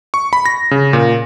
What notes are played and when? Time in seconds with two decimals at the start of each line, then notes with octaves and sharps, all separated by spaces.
0.14 C#6
0.33 B5
0.46 A#6
0.71 C#3
0.93 A#2